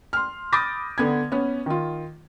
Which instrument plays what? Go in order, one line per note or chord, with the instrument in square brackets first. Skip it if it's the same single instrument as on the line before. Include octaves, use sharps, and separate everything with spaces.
[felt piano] C6 F6
B5 D6 D#6 G6 A6 A#6
D3 B3 G#6
B3 C#4
D#3 F4